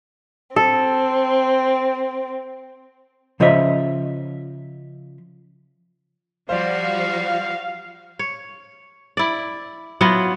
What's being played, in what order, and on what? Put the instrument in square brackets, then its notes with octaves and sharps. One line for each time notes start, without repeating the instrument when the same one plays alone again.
[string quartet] C4 [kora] A4
[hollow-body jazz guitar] C#3 F3 C5 C#5 D#5 E5
[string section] F3 G3 F#4 [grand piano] C5 D5 [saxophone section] F5
[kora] C#5
E4 D5
F#3 B3 E4 F4